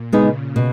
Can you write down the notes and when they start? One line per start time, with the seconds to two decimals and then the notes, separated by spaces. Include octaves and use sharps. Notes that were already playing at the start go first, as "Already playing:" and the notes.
Already playing: A#2
0.13 C#3 G#3 B3 D#4
0.56 B2